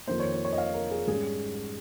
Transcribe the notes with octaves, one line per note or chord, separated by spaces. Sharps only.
F2 D#3 A#3 C5
C#5
C5
C#5
D#5
F5
A#4
G#4
G#2 G3 C#4 G#4